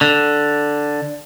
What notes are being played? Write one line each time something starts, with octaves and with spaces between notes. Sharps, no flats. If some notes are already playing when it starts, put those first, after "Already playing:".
D3